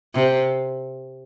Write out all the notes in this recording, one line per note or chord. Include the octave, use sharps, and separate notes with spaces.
C3